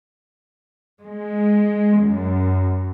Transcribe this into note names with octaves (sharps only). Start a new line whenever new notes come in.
G#3
F#2